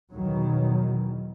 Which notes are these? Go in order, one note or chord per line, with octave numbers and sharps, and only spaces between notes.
E2 B2 D#3 F#3